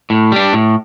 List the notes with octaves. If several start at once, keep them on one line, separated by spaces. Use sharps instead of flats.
A2
G3 D4
A2